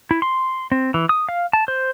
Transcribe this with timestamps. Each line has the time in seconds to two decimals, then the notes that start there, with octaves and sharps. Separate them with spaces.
0.11 E4
0.22 C6
0.72 C4
0.94 E3
1.09 D#6
1.29 F5
1.53 A5
1.68 C5